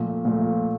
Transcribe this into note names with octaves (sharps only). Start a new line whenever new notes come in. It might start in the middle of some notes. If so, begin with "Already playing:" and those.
Already playing: A#2 F3 A3
A#2 F3 A3